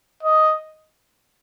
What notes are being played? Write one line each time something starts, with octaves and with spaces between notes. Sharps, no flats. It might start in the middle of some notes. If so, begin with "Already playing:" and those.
D#5